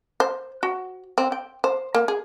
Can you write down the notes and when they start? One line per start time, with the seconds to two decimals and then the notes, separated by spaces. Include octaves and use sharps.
0.20 C5
0.63 F#4
1.18 C4
1.32 G5
1.64 C5
1.95 A#3
2.08 G#4